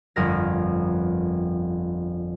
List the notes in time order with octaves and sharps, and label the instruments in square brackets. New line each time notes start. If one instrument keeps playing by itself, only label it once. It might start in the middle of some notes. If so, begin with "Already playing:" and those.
[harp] G1 F2 A#4 A#6